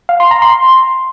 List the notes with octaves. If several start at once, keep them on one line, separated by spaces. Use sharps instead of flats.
F5
C6
A#5
C6